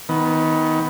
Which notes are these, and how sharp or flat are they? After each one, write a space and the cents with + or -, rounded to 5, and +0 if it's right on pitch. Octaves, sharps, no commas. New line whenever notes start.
D#3 +25 B3 +0